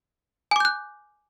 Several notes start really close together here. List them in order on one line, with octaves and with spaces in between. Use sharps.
G#5 D6 G6 F#6